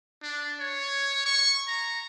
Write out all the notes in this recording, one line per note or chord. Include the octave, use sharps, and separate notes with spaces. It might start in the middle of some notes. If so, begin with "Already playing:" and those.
D4
C#5
C#6
A#5